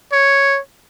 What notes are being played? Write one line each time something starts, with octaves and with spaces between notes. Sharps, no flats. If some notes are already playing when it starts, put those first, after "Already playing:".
C#5